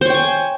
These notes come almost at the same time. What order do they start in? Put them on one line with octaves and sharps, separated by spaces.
C5 C#5 G5 G#5